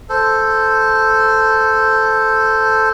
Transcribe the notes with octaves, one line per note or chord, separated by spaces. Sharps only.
A4 C5